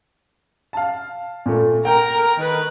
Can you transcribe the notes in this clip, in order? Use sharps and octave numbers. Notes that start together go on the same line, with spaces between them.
F5 A5
A#2 A3
A#4 G5 A#5
D#3 B4